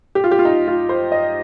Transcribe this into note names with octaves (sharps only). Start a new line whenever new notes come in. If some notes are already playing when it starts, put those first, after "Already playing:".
G4
F4
G4
F4
D#4
F4
C5
D#5